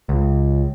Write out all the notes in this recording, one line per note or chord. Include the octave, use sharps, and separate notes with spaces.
C#2